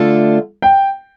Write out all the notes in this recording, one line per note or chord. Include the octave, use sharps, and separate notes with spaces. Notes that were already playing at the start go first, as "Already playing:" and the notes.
Already playing: D3 A3 D4 F4 A4
G5